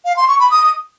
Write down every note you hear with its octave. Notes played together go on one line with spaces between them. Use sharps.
F5
C6
C#6
B5
D#6